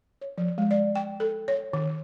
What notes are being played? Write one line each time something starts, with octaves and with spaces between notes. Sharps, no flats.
C#5
F3
G#3
D5
G5
A4
C#5
D#3